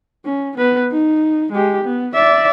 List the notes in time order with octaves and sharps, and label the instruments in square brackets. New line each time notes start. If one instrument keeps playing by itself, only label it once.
[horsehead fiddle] C#4
B3 B4
D#4
G#3 G4
B3
D5 E5